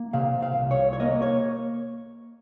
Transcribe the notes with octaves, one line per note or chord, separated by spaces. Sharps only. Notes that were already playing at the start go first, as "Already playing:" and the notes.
Already playing: A#3
C3 F5
F5
C2
C#5
C#5
A#3 D#5
C#5